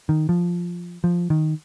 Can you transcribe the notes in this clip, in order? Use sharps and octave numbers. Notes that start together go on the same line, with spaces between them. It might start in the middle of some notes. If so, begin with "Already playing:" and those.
D#3
F3
F3
D#3